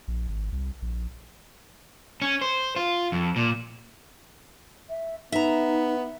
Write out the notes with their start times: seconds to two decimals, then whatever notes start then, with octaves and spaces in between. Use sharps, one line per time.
0.08 A#1
0.28 G#1
0.52 C2
0.82 A#1
2.22 C#4
2.41 C5
2.76 F4
3.12 F2
3.36 A#2
4.90 E5
5.32 B3 D#4 E5 A#5